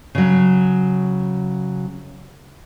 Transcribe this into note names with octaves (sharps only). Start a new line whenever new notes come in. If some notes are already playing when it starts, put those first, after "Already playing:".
C#3 F#3